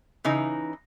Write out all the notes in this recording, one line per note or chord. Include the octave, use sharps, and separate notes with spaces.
C#3 E3 D#4